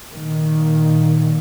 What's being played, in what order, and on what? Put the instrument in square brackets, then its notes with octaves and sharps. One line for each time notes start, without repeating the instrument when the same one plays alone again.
[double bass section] A#2 D#3